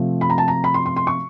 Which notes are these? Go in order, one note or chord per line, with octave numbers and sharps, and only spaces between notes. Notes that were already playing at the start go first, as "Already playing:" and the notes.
Already playing: C3 F3 A3 C4
B5
A#5
A5
A#5
B5
C6
C6
C6
C#6